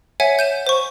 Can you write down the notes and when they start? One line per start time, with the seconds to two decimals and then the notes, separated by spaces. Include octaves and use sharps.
0.20 C#5 E5 F#5 G#5
0.39 G6 D#7 E7
0.67 C5 C#6